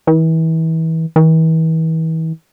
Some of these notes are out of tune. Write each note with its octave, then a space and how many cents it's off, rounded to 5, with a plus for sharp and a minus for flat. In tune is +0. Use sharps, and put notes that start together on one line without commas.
E3 -30
E3 -40